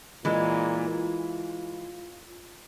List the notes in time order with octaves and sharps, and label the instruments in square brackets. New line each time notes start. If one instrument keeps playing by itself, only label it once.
[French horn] A#2 [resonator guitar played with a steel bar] E3 G#3
[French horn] F4